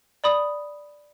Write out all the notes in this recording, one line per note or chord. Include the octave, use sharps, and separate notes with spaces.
D5 B5 D#6